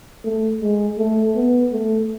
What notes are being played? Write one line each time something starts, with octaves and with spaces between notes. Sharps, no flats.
A3
G#3
A3
B3
A3